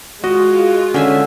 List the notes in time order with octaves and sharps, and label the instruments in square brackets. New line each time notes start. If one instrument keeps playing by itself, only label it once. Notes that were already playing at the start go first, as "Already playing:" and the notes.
[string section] G#3 F4 [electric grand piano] F#4 [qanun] D#5
[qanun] D3 E5 G#5 [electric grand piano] C#4